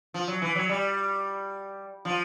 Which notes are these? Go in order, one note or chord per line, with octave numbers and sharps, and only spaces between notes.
F3
F#3
E3
F#3
G3
F3